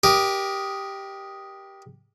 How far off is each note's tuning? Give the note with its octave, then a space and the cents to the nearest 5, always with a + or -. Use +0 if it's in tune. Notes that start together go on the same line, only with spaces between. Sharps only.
G4 +0 A#4 +35 D#5 +0